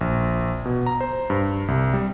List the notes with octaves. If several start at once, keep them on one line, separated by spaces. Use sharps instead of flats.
A#1
B2
A#5
C5
G2
C2
G3